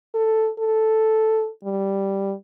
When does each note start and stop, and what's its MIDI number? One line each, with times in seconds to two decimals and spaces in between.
0.15 0.50 69
0.59 1.49 69
1.64 2.34 55